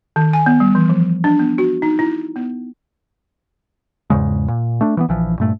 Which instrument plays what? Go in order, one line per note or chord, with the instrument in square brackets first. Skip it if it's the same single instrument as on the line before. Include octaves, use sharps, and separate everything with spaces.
[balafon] D#3
G#5
B3
G3
E3
F3
D4
B3
F#4
D#4
E4
B3
[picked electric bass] E2 G#2 C#3 G#3
A#2
A3 D4
E3 G#3 B3
A#1 E3 F3
G2 A#2 A3